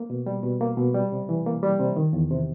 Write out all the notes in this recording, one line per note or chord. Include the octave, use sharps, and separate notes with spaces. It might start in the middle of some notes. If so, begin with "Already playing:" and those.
Already playing: A#3
B2
G3
B2
A#3
B2
G3
C3
E3
A#3
G3
C3
D#3
E2
C3